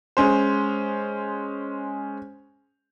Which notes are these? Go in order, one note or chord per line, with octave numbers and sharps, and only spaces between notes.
G#3 C#4 C5